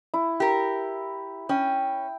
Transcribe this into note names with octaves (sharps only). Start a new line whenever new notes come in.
E4
G4 A#4
C#4 G5